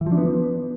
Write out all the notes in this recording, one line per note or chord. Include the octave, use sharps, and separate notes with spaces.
E3
F3
D4
B3